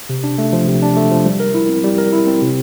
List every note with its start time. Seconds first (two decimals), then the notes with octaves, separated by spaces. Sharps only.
0.10 C3
0.24 D4
0.38 A3
0.53 F3
0.68 C3
0.82 D4
0.96 A3
1.11 F3
1.26 G3
1.40 A#4
1.54 E4
1.69 C4
1.83 G3
1.98 A#4
2.13 E4
2.27 C4
2.42 C3